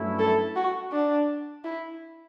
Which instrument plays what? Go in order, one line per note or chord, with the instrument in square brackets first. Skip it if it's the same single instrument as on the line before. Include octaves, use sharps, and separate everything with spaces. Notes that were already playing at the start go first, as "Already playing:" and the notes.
Already playing: [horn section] G2 F#3 A3 C#4 E4
[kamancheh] A4
F#4
D4
E4